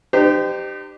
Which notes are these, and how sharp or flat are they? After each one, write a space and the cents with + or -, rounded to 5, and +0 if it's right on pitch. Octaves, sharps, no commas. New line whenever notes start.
D#4 -45 G4 +0 C5 -35